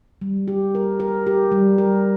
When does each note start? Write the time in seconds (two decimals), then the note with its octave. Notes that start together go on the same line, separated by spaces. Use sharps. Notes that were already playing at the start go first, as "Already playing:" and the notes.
0.21 G3
0.48 G4
0.75 A#4
1.00 A#4
1.27 G4
1.52 G3
1.78 A#4